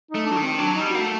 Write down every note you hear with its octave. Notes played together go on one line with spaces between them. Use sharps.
A3 D#4
D4
F#3
D#3
C4
F#3 D4
D#4
G3
A#3 F#4
A3